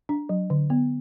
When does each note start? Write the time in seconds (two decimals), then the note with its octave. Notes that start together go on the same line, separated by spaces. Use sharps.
0.09 D4
0.29 F#3
0.50 D3
0.70 B3